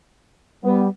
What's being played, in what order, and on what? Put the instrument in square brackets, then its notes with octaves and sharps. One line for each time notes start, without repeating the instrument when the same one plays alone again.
[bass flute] G3 [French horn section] B3